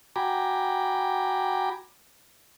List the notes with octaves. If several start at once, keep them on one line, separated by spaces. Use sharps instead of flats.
F#4 G5 G#5 A#5 B5 D6